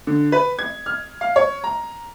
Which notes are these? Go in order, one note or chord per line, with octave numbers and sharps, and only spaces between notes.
D3
B4
G#6
F6
F5
C#5
A#5